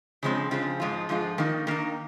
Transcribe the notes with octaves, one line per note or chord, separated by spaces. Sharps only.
C#3 F3 G#3 C4
C#3 F3 G#3 C4
G#2 F3 G#3 F4
G#2 F3 G#3 F4
D#3 A#3 D#4
D#3 A#3 D#4